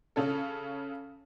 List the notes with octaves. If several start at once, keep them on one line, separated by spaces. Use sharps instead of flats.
C#3 C#4 A4